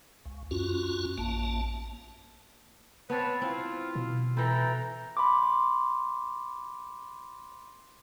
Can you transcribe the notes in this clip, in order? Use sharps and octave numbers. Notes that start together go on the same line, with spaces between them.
C#2
F#2 C#4 F4 F#4
A1 A#3 A5
B3 C4 B4 C#5 A5
C4 E4 F4
B2
E3 E4 A4 G5 A#5
B5 C6 D6